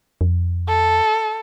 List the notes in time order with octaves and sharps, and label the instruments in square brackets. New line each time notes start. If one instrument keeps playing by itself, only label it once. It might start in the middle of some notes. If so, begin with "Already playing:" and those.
[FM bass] F2
[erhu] A4